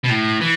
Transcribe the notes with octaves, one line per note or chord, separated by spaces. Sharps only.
B2
A2
E3